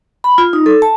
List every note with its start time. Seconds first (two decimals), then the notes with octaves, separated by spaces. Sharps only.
0.24 B5
0.38 F4
0.53 D#4
0.66 A4
0.82 A5